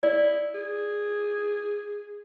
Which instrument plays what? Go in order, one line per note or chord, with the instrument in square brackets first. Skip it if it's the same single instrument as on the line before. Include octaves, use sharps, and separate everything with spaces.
[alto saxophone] E4 [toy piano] D5
[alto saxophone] G#4